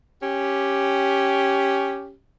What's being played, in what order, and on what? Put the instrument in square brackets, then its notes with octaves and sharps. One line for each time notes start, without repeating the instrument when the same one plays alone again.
[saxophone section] C#4 G4